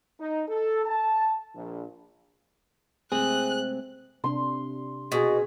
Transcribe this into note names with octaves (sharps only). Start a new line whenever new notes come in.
D#4
A4
A5
A#1
C3 G#3 A3 C4 G#4 F#6
C3 D4 C6
B2 G#4